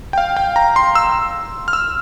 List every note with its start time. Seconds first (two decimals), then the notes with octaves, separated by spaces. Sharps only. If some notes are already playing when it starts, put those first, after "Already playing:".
0.13 G5
0.18 F5
0.37 G5
0.56 A#5
0.76 C6
0.95 E6
1.68 F6
1.73 E6